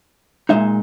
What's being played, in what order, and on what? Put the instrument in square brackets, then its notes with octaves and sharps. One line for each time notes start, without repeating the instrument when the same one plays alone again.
[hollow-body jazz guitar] A#2 G#3 D#4 E5